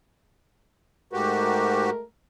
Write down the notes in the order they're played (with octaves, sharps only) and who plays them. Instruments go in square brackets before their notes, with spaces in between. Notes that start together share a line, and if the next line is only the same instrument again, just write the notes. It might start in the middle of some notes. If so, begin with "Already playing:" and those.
[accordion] G#2 F#4 G4 [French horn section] G#3 A3 A#4